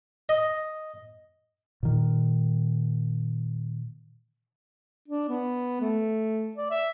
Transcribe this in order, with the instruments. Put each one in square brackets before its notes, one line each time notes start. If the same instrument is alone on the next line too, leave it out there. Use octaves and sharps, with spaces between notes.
[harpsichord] D#5
[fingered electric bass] A#2 D#3
[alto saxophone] D4
B3
A3
D5
E5